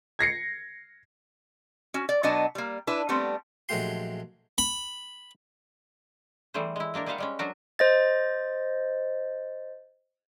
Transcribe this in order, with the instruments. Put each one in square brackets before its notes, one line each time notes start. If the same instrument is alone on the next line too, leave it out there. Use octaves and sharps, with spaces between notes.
[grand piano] G#6 A#6 C7 C#7
[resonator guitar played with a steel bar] C#4 F#4
D5
B2 F#3 B3 D4 D#5 A5
G3 A#3
D4 E4 B4
G3 A3 B3 C4
[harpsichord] A#1 F#3 G#3 A3 G4 C6
B5
[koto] E3 G3 A3 G#4 C5
G#3 E4
G#3 A#3 D4 A#4
G3 G#4 B4 C5 F5 F#5
G3 G#3 C#4
F#3 D4 F#4 A#4
[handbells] C5 D#5 A6